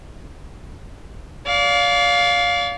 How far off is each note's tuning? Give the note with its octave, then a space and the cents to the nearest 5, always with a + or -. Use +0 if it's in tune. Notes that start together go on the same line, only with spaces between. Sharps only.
D5 -35 F5 +10